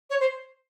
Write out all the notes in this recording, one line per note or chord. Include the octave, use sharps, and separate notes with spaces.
C#5
C5